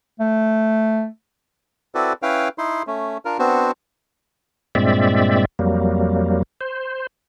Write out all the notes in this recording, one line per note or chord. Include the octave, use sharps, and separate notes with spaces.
A3
C4 E4 F#4 A4 B4 D5
C#4 E4 B4 F5 G5
D#4 E4 C6
A3 C#4
D4 F4 A#4
B3 C4 D4 F#4 C5
G2 A#2 G#3 C4 D5 E5
F2 F#3 G3 A#3
C5